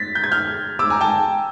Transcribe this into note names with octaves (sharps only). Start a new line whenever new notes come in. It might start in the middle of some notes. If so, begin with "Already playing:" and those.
Already playing: A6 B6
G6
G#6
F6 G6
D6 E6
G#5 A#5
G5 A5